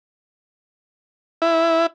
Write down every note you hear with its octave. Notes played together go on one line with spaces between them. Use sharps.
E4